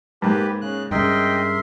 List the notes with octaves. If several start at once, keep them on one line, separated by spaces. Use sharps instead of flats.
G#2 A#3 G4 B4
C#3 F#6
G2 C#3 A#4 D#5 E5 G5 C6